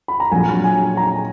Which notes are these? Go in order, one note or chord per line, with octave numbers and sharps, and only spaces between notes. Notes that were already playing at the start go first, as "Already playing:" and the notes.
B5
A#5
A#1 A#2 F#3 G#5
G#5
A#5